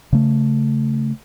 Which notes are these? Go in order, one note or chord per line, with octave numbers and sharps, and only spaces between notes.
C#3 A3